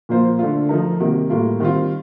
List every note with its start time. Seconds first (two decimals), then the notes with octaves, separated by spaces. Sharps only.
0.09 A#2 F3 A#3 F4 C5
0.39 D3 A3 D4 F4
0.69 F3 A3 D#4 A#4
1.00 C3 D#3 G3 A#3
1.30 A2 G3 A#3 F4
1.60 D#3 G3 C4 F4